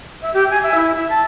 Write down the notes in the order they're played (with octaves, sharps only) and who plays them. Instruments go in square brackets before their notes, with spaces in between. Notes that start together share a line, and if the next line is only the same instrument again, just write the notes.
[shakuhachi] E5
G4
G#5
E5
E4
E5
A5